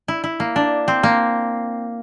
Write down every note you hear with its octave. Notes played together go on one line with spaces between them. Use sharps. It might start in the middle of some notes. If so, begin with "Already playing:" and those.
E4
E4
A#3
D4
C4
A#3